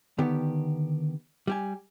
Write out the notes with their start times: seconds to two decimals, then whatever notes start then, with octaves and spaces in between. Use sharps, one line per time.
0.18 D3 D#3 B3 G4
1.47 G3 G4 G#5